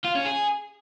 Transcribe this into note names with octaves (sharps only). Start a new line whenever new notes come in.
F4
C#4
G#4